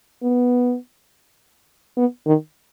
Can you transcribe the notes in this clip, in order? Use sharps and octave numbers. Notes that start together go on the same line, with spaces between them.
B3
B3
D#3